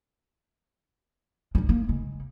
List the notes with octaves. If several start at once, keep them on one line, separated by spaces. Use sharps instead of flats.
C#2 D4
A#3
C#3 G#3